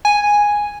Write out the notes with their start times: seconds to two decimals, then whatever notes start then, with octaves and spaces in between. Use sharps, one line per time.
0.05 G#5